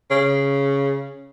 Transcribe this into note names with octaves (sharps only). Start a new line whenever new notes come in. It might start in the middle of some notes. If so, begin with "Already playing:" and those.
C#3